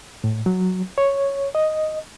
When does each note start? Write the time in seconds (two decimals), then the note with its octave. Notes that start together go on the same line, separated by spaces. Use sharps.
0.24 A2
0.46 F#3
0.98 C#5
1.55 D#5